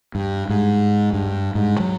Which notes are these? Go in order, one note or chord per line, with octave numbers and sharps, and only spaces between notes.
G2
G#2
G2
G#2
F#3